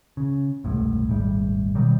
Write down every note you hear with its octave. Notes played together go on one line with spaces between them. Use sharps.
C#3
E1 C2 F#2 A2
D#1 G#1 A2 G3
B2 D#3 F#3 G3